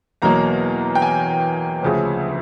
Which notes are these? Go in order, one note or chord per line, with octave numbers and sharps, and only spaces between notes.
E2 B2 F#3 A#3 A#5
G5
G#5
D2 C#3 F3